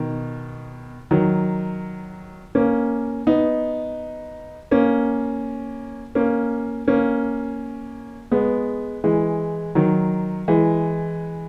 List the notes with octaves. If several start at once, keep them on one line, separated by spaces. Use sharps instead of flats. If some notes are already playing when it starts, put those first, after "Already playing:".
Already playing: B2 D#3
D#3 F#3
A#3 C#4
B3 D#4
A#3 C#4
A#3 C#4
A#3 C#4
G#3 B3
E3 G#3
D#3 F#3
E3 G#3